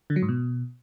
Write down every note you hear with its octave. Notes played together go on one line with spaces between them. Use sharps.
D3
F#3
G#2
B2